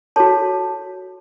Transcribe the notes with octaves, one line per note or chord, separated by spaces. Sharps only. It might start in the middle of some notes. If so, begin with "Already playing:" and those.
F#4 A4 C#5 A5